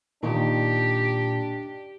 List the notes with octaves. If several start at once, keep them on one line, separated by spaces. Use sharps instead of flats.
A#2 D#3 D4 G4